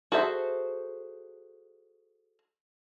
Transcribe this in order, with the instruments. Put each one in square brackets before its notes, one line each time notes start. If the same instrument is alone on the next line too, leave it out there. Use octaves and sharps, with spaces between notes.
[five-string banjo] F#4 G#4 A4 C5 E5